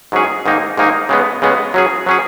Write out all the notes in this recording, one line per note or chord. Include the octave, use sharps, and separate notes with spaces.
G#2 F#3 C#4 G#4
G#2 D#3 A#3 D#4
G#2 D#3 A#3 D#4
C#3 G#3 B3
C#3 G#3 B3
F#3 C#4 G#4
F#3 C#4 G#4